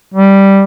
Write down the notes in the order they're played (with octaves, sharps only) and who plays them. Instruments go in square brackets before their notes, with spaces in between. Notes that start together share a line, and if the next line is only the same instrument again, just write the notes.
[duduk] G3